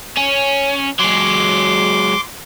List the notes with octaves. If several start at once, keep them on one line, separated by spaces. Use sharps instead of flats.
C#4
F#3 G#3 C6 D6